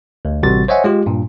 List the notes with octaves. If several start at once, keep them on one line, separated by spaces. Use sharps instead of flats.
D2
A1 C3 G3 F#4 A6
C5 C#5 D#5 E5 F#5 G#5
G#3 F4 G4
G2 A#2